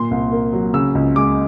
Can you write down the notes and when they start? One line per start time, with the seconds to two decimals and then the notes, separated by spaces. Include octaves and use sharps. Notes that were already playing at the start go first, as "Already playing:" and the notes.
Already playing: A#2 C6
0.11 C2
0.32 A#3
0.53 F#3
0.74 C#3 E6
0.95 C#2
1.16 G#3 D6